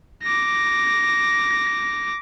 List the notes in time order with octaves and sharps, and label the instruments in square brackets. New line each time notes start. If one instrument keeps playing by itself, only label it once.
[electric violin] D6 A#6